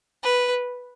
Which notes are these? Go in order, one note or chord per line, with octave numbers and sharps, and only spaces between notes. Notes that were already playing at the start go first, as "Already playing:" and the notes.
B4